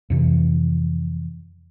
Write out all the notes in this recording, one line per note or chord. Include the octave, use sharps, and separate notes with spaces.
F2 C3 E3